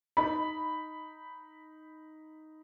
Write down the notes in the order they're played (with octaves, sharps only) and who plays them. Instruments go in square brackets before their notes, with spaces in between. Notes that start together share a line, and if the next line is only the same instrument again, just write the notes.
[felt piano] D#4 B5